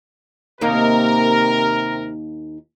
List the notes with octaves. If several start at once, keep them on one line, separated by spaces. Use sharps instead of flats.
D#2 C3 A#3 D#4 A#4